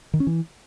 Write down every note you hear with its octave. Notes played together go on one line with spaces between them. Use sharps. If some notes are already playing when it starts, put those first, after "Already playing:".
D#3
C#4
E3